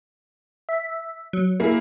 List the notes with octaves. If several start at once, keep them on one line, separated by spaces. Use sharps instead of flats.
E5
F#3
A#3 E4 G#4